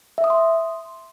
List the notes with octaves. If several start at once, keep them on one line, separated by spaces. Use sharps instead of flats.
E5
D#6
C6